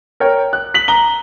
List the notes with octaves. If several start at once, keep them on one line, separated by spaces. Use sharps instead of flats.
A#4 C#5 G5
F#6
B6 F#7
A#5 G7